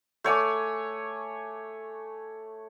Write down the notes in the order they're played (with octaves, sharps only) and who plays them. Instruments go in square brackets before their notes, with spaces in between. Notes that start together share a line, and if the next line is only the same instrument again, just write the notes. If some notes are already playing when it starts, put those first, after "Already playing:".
[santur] A3 C#5 G#5 D6